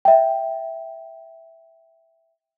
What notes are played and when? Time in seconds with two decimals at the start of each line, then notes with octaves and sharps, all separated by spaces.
0.05 E5 G5